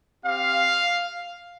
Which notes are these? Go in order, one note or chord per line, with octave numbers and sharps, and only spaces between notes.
C4 G4 F5